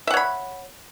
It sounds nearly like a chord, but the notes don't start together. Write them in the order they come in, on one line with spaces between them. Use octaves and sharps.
E5 F#5 C#5 B5